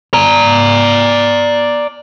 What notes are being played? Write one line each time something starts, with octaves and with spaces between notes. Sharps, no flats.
D5 A#5